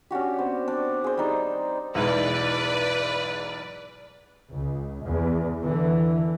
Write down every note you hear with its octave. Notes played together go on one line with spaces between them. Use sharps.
C#4 D4 F#4 G4
B3 C4 C5
D4
G#4 C5
G3 D#4 D5
B1 E2 G#2 B4 D5
C#2
E2
D3 E3